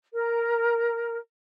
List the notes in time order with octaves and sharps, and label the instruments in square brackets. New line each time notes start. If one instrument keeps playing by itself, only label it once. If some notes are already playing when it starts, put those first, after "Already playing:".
[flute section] A#4